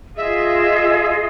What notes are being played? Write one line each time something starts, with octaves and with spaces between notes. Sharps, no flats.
F4 G#4 D#5 E5